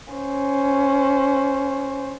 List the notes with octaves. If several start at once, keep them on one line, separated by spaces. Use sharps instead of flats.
C#4 C5